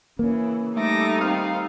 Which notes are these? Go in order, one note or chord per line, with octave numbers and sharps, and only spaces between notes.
C#3 E3 A#3 C#4
G3 A3 D#4 E5 D6 A#6
D#3 A3 C4 F5